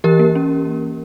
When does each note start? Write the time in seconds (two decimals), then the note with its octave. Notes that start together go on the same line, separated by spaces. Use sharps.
0.04 E3 G4 A#4
0.20 A#3
0.35 C#4